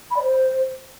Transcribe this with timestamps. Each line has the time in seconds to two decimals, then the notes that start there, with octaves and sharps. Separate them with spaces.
0.11 B5
0.16 D5
0.22 C5